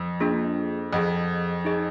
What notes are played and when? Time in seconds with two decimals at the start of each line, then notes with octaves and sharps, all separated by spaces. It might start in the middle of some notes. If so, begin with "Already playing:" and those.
Already playing: F2
0.20 A#3 D4 F4 G#4
0.93 F2 G#4 D#5 F#5
1.65 D#4 G#4 D#5